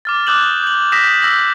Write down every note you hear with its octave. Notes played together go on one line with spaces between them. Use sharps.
D6 F6 A6
D6 D#6 F#6 G6 E7 F#7
G6 F#7
D#6 G6 A#6 B6 E7
E6 G6 A#6 F#7